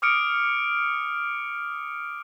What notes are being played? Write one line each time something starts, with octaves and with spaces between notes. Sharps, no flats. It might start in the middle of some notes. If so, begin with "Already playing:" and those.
D6 D#6 F6 C#7 D7